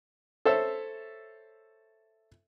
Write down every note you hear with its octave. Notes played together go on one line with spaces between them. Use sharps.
A4 C5 C#5 E5 E6